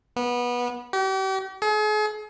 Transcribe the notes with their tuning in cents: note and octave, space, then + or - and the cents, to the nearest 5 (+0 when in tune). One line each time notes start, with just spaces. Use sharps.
B3 -20
G4 -40
G#4 +40